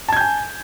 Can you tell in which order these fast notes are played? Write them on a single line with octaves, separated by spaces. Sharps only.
A5 G#6 G6 G#5